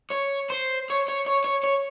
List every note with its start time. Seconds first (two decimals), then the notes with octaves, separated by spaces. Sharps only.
0.11 C#5
0.50 C5
0.90 C#5
1.08 C#5
1.26 C#5
1.44 C#5
1.63 C#5